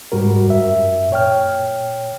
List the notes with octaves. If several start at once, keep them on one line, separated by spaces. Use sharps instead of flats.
G#2 G3 F#4 A#4
F#2 E5
A#2 C#5 G5 F6